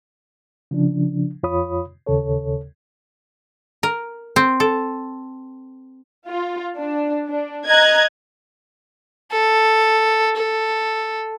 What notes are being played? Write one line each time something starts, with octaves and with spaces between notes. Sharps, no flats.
C#3 F3 D4
F2 F4 C#5 B5 D#6
D#2 C#3 A4 C#5
A#4
C4
A4
F4
D4
D4
D#5 A#5 F#6 G#6
A4
A4